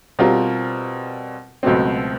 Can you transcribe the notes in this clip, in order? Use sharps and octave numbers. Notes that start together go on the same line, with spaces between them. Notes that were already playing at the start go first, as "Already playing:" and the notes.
B2 G3 C4 F4 A#4
C#2 B2 F#3 A3 C4